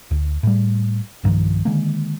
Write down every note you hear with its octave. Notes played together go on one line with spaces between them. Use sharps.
D2
A2 G3
B1 G2 D#3 F3
D3 D#3 G#3 A#3